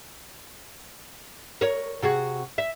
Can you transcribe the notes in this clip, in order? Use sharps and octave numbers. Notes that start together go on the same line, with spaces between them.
A#4 C#5
C3 F#4 G#4
E5